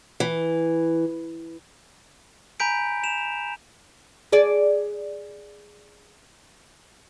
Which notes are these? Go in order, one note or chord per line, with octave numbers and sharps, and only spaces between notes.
E3
G#5 A#5 B5 G6 B6 D7
E7 F7
G#4 D5